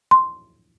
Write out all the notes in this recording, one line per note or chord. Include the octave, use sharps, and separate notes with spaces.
C6